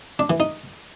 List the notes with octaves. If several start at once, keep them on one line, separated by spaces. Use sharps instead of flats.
D4
E3
D#4